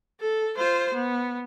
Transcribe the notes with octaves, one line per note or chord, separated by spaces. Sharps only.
A4
F4 C5
B3